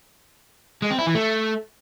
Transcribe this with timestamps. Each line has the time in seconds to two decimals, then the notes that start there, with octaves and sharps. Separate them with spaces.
0.82 G#3
0.90 C4
0.99 E4
1.07 E3
1.15 A3